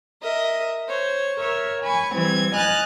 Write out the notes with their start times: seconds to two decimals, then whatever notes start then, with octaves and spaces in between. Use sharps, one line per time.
0.23 A#4 D#5 E5
0.88 C5 C#5
1.40 A#4 C#5 E5
1.80 G#5 B5 C#6
2.13 E3 G3 C4 G#6
2.53 D#5 G#5 F6 F#6 A6